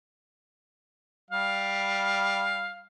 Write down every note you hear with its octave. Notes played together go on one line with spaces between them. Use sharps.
G3 F5